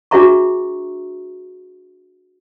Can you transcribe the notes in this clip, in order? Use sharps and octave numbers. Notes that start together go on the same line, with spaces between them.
D4 F#4 G#4 E5 A#5 C#6